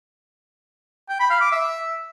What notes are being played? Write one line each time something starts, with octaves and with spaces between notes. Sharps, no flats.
G5
B5
F5
D6
E5